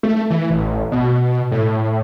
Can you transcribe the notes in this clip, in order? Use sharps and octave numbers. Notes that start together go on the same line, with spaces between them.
A3
E3
A1
B2
A2